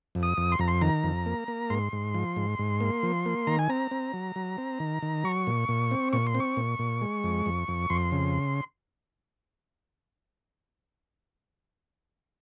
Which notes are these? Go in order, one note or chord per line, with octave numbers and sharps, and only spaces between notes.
F2
D#6
F2
C6
F2 A#5
C6
D#3 A#5
F2
A#3
A#3
G#2 C6
G#2
F3
G#2
G#2
A#3
F3
A#3
D#3 A#5
G#5
C4 A#5
C4
F#3
F#3
C4
D#3
D#3
F#3 C#6
A#2
A#2
C4
A#2 C#6
C6
C4
C#6
A#2
A#2
G#3
F2
F2
F2
F2 C6
C#3